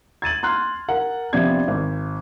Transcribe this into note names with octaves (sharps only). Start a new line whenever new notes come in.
G#6 A6 D#7 F#7
C6 F6 F#6
A#4 F#5
C3 F3 B3 D4 G4 G#6
G#1